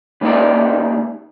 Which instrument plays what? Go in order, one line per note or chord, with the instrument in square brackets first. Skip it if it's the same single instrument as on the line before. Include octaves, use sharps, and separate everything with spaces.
[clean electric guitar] C#3 A3 A#3 D#4 D5